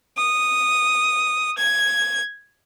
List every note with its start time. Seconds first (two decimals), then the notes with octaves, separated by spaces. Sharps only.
0.17 D#6
1.58 G#6